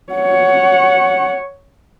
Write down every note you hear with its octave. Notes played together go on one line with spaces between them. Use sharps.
C#5 F#5